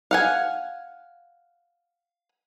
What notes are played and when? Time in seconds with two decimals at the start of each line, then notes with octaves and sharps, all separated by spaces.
0.11 F5 F#5 G#5